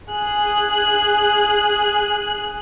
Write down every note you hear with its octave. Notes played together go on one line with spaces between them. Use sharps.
G#4 F#6